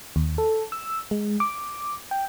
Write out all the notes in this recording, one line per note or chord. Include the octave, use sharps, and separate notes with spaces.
D#2
A4
E6
G#3
D6
G5